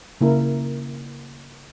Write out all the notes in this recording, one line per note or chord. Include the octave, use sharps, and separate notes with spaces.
C#3 A#3 E4 A#4